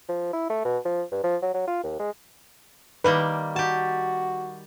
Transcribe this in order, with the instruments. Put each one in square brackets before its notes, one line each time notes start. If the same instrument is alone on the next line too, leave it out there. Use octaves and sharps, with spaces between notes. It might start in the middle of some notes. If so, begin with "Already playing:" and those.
[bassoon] F3
E4
A3
B2
F3
G2
F3
F#3
F#3
F4
D#2
G#3
[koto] D#3 G3 A#3 [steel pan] B4
[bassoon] F#4 [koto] G4 A5